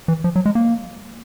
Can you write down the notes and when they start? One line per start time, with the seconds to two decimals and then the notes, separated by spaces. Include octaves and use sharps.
0.08 E3
0.24 F3
0.36 F#3
0.46 G#3
0.55 A#3